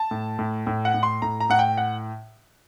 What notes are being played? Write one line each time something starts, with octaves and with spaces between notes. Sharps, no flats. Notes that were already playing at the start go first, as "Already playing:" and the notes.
Already playing: A5
A2
A2
A2
F#5
A2
C6
A2 A#5
A#5
A2 F#5
G5
F#5